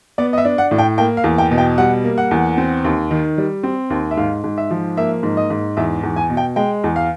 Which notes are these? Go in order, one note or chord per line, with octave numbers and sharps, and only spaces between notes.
B3 D5
D#5
E5
D4
F#5
A2
G5
A#3 G5
F5
E2
G5
B2
G5
G3 F#5
A#3
F#5
E2
C4
D#2
D#3
G3
C4
D#2
E5
G#2 F5
G#2
E5
F3
A#3 E5
G#2
D#5
G#2
E2 E5
E2
G#5
B2
G5
G#3 G5
E2
F5